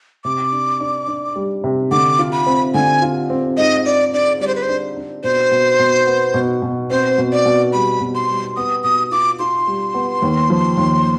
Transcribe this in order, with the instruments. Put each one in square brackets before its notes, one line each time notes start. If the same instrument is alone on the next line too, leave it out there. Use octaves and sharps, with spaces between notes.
[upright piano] C3 [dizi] D6
[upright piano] D4
D4
D4
G3
C3
[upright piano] D3 [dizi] D6
[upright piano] F4
[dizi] B5
[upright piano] C4
[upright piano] D3 [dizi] G#5
[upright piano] F4
C4
[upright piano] G#2 [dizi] D#5
[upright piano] D4 [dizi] D5
[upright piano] D4 [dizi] D5
[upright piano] G3 [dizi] D5
[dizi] C5
B4
C5
[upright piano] D4
D4
[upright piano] B2 [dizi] C5
[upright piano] B2
B2
B3
B2
B2
[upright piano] C4 [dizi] C5
[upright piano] B2
[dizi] D5
[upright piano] B2
[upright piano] G3 [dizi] B5
[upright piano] B2
[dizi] C6
[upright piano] G3
[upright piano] B3 [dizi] D#6
[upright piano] B2 [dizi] D#6
[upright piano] F4 [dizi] D6
[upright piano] F4 [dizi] C6
[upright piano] G3
B3
D#2
F3
D#2